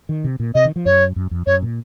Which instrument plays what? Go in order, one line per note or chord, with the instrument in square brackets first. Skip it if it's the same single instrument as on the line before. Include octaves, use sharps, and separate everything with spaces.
[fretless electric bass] D#3
C3
A#2
[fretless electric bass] C3 [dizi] D#5
[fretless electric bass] D#3
F3
[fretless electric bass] F#2 [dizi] C#5
[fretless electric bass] F#2
F2
[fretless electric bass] F#2 [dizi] C#5
[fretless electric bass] A#2